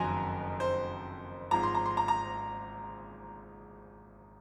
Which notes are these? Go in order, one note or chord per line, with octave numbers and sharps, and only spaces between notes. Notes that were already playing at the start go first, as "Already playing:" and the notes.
Already playing: F#1 F2 D#3 F#3 G#5 A#5 C6
C5
G#1 G#2 F3 A#5
C6
A#5
C6
A#5
A#5